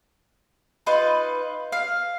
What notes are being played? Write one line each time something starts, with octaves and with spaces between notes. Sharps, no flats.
D#4 F4 B4
F5